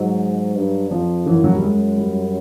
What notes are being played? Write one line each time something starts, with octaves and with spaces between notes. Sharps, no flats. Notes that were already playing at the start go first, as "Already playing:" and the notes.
Already playing: G#2 F#3
G2
F2 F3
F#2 E3
F3
F#3
G3
G#3
G3